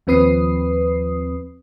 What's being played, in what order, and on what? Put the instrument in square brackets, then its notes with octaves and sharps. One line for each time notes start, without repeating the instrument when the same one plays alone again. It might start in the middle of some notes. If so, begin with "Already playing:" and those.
[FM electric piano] D#2 F3 C4 B4 D#6 C7